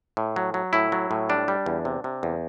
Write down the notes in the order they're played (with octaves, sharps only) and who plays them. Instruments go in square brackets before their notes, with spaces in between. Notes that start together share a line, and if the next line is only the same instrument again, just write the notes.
[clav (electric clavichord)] A2
F#3
F#3
A2 E4
F#3
A2
G3 D4
G3
E2
C3
C3
E2